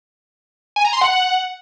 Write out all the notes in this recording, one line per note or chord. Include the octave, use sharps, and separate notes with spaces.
G#5
A#5
C6
F#5